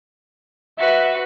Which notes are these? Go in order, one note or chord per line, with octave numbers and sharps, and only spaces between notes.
F#4 B4 E5